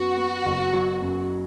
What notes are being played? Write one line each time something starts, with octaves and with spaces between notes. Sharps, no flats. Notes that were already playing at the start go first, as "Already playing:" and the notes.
Already playing: F#2 B3 F#4
B3
F#1
F#3
F#2